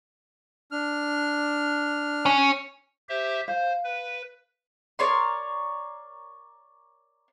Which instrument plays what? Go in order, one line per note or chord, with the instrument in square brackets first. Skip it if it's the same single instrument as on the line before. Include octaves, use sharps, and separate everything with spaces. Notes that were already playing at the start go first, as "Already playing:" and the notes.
[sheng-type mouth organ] D4 F6
[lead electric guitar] C#4
[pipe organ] G4 C5 E5
[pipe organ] C5 [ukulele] F5
[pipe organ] B4
[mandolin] A#4 C#5 D5 C6